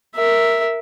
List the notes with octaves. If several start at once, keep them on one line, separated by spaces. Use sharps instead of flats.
A#4 E5